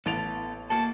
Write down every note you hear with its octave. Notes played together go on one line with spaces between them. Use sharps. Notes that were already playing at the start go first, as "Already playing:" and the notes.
A1 B3 A4 D7 F7
A#3 F#4 A4 A5